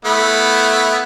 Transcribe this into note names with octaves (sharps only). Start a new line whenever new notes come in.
A3 B3 E4